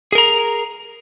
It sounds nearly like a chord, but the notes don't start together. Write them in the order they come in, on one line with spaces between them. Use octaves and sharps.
G#4 A#4 A#5